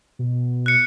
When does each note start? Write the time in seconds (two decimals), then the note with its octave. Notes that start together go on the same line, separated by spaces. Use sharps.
0.19 B2
0.66 F#6 C#7